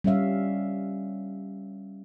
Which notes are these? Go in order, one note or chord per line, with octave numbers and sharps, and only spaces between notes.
G3 C#4 C#5 E5 F5